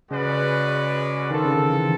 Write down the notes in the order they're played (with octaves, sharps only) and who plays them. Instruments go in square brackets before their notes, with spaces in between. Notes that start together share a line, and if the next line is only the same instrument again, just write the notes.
[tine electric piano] C#3 [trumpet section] G#3 C#4 F#4 B4 D5
[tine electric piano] D#3 [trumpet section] C4 F4 A4
[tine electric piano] C#3
D3
E3